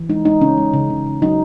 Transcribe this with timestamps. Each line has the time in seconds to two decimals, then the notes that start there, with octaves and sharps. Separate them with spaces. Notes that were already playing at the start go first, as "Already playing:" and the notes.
Already playing: E3
0.09 G#3 D#4
0.25 G#3 D#4
0.41 C#3 C#4
0.58 G#3
0.74 C#3
0.90 C#3
1.06 C#3
1.22 F#3 D#4